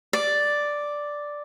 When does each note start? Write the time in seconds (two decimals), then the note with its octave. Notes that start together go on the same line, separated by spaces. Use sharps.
0.13 D5